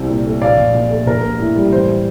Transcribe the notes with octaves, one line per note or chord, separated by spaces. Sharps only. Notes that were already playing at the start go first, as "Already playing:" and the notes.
Already playing: C2 C4
A#2
A3
A#1 D5 F5
A#1
A#2
A3
A#1 A#4
A#3
A2
G3
A1 C5